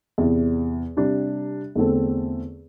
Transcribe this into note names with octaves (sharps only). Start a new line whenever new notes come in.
E2 C3 E3
C3 G3 D4
E2 D3 A3 C4 A4